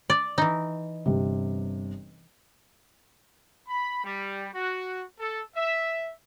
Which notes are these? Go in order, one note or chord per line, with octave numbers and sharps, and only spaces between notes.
D5
E3 D#4
G1 C3
B5
G3
F#4
A4
E5